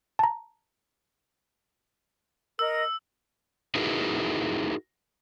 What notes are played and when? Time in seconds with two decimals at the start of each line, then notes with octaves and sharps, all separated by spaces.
0.19 A5 A#5
2.59 A#4 D#5 E6
3.75 D#4 E4 F#4 G#4 A#4 B4